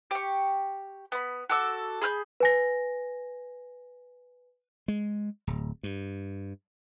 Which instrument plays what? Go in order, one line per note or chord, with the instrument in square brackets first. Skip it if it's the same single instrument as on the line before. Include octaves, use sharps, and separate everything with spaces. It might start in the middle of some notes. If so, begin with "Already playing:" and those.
[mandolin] G4 C#6
B3 B5
F#4 A4 D6 E6
G#4 B5 F6 G6
[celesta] B4 G#5 A#6
[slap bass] G#3
D1
G2